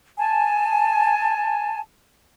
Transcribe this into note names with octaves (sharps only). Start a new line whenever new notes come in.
G#5 A5